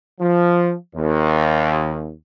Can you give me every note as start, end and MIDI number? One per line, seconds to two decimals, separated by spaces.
0.20 0.74 53
0.96 2.11 39